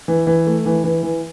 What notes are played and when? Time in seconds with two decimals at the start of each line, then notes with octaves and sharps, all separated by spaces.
0.08 E3
0.27 E3
0.47 A3
0.66 E3
0.84 E3
1.03 E3